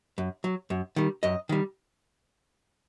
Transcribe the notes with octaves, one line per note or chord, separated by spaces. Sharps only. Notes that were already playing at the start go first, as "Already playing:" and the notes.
F#2
F#3
F#2
D#3 G3
F#2 D#5
D#3 G3